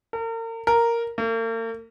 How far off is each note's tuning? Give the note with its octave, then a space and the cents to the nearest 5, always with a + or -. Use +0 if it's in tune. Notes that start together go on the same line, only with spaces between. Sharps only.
A#4 -40
A#4 -5
A#3 -45